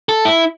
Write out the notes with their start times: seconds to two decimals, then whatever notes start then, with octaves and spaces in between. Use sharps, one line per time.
0.09 A4
0.25 E4